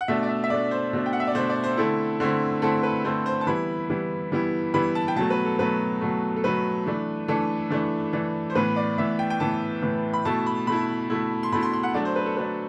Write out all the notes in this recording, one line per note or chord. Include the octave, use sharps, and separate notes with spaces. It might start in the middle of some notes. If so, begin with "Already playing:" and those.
F#5
B2 A3 D4 E5
D5
E5
E5
B2 A3 D4 D5
C5
B2 A3 D4
G5
F#5
E5
D5
B2 A3 D4 C5
D5
C5
D3 A3 C4 E4 A4
D3 A3 C4 E4
D3 A3 C4 E4 A4
B4
D3 A3 C4 E4 C5
C5
A5
E3 G3 B3 E4 B5
E3 G3 B3 E4
E3 G3 B3 E4
E3 G3 B3 E4 B5
A5
G5
B2 F#3 A3 A5
B4
A4
B2 F#3 A3 B4
B2 F#3 A3
A4
B2 F#3 A3 B4
E3 A3 D4
E3 A3 D4 A4
E3 A3 D4
E3 A3 D4
C5
A2 E3 B3 B4
D5
A2 E3 B3 E5
G5
G5
A2 E3 B3 A5
A2 E3 B3
B5
B2 A3 E4 A5
B5
B2 A3 E4 B5
B2 A3 E4
C6
B2 A3 E4 B5
C6
C6
F#5
F#3 A3 D4 D5
C5
B4
A4
F#3 A3 D4 B4